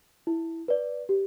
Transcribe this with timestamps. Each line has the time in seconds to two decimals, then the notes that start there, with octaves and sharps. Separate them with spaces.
0.27 E4
0.68 B4 D5
1.09 G4